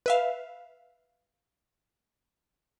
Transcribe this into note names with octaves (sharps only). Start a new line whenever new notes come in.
B4 E5 F5